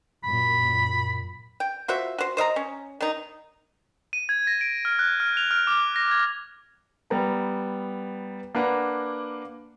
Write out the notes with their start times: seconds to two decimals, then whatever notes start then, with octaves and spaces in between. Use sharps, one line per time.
0.24 F#2 A#2 B5
1.60 G5
1.88 F4 F#4 C5 E5
2.18 F#4 C5
2.37 C5 D#5 E5 A#5
2.56 C#4
3.00 D#3 D#4
4.13 D#7
4.29 G#6
4.47 A#6
4.61 D7
4.85 F6
4.99 F#6
5.20 F6
5.37 F7
5.51 F6
5.67 D6
5.96 A#6
6.12 G#6
7.10 G3 B3 A#5
8.55 A#3 D4 B4 F#5 A#5